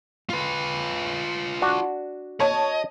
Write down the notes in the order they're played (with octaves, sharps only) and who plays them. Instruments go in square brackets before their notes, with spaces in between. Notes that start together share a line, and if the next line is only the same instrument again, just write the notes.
[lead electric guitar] F4 B4
[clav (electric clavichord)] D4 F#4
[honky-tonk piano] C#5 A5 [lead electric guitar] D#5